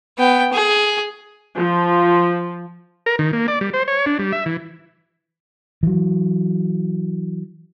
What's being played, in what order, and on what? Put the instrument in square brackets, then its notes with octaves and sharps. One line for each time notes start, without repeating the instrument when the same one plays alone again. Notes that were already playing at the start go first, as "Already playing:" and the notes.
[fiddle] B3 G5
G#4
[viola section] F3
[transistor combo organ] A#4
D#3
A#3
D5
G3
C5
C#5
D4
G3
E5
E3
[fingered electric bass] E3 F#3